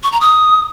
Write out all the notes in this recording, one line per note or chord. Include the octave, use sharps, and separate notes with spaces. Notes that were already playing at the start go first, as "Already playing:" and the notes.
C#6
A#5
D#6